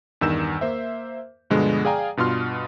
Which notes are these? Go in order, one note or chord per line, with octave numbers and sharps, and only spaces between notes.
E2 G2 D#3 E6 G6 E7
A#3 C5 E5
G2 B2 D3 F3 G#3 B3
G#4 D5 F5 G5 G#5 A#5
G2 B2 F4 C6 F6